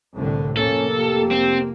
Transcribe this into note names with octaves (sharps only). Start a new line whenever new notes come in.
C2 A2 D3
F1 A#3 C#4 A4
G4
C4